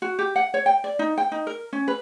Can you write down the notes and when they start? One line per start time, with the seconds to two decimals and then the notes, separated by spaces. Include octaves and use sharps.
0.02 F#4
0.19 G4
0.36 F#5
0.54 C#5
0.66 G5
0.84 D5
0.99 D#4
1.18 G5
1.32 D#4
1.47 A#4
1.73 C#4
1.88 B4